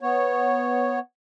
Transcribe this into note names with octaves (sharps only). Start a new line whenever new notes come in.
B3 C#5